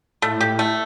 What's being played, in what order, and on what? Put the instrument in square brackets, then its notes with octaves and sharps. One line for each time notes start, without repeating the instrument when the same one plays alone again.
[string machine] A2 [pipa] A3
[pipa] G4
A3